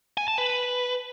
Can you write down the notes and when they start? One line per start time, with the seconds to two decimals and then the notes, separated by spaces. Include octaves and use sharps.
0.17 G#5
0.28 A5
0.38 B4